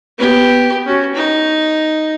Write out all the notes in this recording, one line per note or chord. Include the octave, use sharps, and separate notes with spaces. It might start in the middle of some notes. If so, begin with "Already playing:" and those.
B3 G4
C#4 F#4
D#4